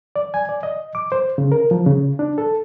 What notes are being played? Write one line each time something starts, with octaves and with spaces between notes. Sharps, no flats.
D5
G#5
D5
D#5
D6
C5
C#3
A#4
F3
C#3
D4
A4